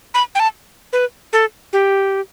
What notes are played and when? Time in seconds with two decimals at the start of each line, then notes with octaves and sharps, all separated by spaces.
0.14 B5
0.35 G5
0.40 A5
0.93 B4
1.33 A4
1.73 G4